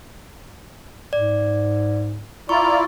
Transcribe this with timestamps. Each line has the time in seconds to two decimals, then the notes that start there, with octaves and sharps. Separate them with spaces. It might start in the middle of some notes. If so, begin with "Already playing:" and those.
1.13 G#2 D5
2.49 E4 F4 D5 A#5 C#6